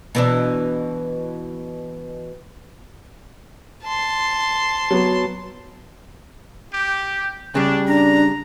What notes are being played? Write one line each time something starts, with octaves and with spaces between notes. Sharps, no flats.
B2 E3 D4
A5 C6
F#3 B3
G4
C#3 G3 D4
D4 A#5